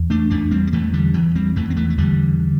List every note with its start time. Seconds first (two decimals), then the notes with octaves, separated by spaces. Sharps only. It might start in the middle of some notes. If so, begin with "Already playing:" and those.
Already playing: E2
0.10 A3 D4
0.30 E2 A3 D4
0.51 G3 C4
0.67 G3
0.73 E2 E3 A3
0.93 D3 G3
1.14 E2 E3
1.35 G3 C4
1.56 E2 E3 A3
1.70 C4
1.76 E3 A3
1.90 A3
1.98 E2 D3 G3
2.40 D3